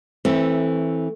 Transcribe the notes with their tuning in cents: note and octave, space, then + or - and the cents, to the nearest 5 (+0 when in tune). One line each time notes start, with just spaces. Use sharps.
E3 -10 A3 +0 C4 +15